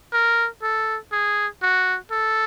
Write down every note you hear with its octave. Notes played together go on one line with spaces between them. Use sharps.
A#4
A4
G#4
F#4
A4